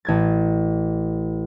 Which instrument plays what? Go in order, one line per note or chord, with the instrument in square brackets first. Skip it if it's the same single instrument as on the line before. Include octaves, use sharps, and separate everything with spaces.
[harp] A1 G#6 A6